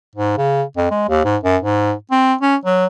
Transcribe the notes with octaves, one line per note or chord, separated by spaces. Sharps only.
G#2
C#3
F2
G#3
D#2
G#2
F#2
G#2
C4
C#4
F#3